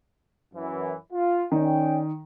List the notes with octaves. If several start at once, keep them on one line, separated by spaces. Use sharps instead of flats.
F#2 E3
F4
D#3 C#4 D5 G5